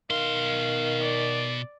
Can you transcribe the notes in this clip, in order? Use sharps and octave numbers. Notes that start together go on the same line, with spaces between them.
B2 D#3 F5 C6
D5